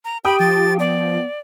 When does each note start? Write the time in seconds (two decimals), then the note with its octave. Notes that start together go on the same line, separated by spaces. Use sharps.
0.05 A#5
0.25 G4 G5 B5 D#6
0.40 F3 A6
0.80 B3 D5